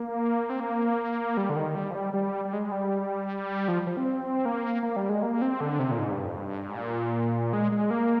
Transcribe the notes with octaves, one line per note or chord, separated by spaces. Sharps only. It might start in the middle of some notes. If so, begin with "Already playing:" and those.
Already playing: A#3
C4
A#3
G3
D3
D#3
G3
F3
G3
G3
G3
G#3
G3
F3
F3
C4
A#3
A#3
G3
G#3
A#3
C4
D3
C3
A#2
G#2
G2
F2
G2
G#2
A#2
G#3
G#3
A#3